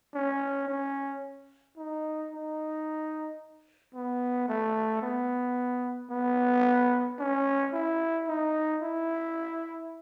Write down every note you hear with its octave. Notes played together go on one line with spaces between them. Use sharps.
C#4
C#4
D#4
D#4
B3
A3
B3
B3
C#4
E4
D#4
E4